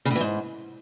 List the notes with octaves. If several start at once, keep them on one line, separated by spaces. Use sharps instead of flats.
C#3
A2
E3
G#2